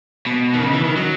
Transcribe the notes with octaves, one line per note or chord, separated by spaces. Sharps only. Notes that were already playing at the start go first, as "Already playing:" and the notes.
B2
D#3
C#3
E3
D#3
F#3